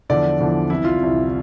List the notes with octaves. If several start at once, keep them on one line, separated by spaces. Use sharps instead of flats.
E2 D3 F3 D5
E2 D3 F3
C2 C3 E3 E4
F4
C2 C3 E3